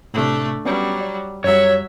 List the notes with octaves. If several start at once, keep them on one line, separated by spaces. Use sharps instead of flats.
A2 C3 A3 D4
F#3 G3 B3 C#4 D5
D5
F#2 F#3 G3 C#5 E5